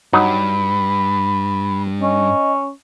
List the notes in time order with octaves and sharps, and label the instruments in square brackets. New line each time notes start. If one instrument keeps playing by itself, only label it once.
[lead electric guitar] G2 [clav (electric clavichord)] F#3 D#4 [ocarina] B5
[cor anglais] C#4 [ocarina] D#5